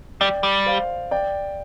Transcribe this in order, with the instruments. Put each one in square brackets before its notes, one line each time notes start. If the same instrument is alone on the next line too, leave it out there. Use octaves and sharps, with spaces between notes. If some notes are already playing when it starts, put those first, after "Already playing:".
[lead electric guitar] G3 [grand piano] D5 G5
[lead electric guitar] G3
[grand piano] C5 F5
D5 G5